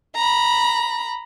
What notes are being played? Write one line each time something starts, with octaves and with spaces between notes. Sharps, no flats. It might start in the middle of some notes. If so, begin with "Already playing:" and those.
A#5 B5